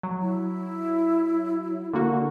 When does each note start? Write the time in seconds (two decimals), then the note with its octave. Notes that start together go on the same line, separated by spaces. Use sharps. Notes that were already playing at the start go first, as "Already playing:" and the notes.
0.03 F#3
0.22 E4
1.93 D3 A#3 F#4